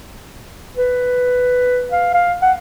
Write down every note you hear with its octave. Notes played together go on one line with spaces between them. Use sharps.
B4
F5
F5
F#5